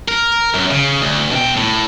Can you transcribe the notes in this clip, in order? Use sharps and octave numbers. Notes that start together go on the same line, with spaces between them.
A#4
F#2
C#3
D2
B2 G5
A2